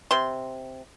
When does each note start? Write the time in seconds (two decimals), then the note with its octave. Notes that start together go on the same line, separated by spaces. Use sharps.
0.11 C3 C6